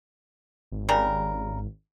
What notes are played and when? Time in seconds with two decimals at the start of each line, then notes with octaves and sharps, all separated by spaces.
0.72 G#1
0.89 C#3 G3 A#4